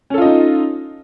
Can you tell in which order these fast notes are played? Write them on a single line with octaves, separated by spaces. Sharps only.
C#4 A4 F4 D#5 D#4